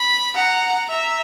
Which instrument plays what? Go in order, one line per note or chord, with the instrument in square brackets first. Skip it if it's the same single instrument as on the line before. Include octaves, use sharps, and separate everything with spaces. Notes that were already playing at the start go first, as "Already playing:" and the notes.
Already playing: [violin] B5
[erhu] F#5 [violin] A#5
[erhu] E5 [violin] A#5